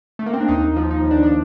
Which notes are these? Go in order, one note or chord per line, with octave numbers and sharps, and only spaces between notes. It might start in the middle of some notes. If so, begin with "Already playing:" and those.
A3
A#3
C4
D4
D#2 D#4
F3
D#4
D#2
D4
D4